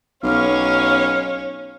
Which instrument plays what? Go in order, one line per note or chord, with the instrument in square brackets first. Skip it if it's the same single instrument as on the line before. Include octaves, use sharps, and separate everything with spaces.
[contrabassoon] B1 [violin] C#4 C#5 [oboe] F5